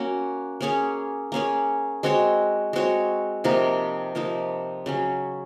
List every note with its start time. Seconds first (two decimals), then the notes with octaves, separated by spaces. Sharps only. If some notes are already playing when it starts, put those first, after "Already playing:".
Already playing: A#3 C#4 F#4
0.61 A#3 C#4 G#4 C#5
1.32 A#3 C#4 G#4 C#5
2.03 G#3 C4 F#4 C#5
2.73 G#3 C4 F#4 C#5
3.44 C3 F3 A#3 D#4
4.15 C3 F3 A#3 D#4
4.86 C#3 F#3 C#4